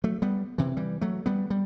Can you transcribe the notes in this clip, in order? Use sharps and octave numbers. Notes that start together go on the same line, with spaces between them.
F#3 A3
G3 B3
C3 E3
E3 G3
F#3 A3
G3 B3
G3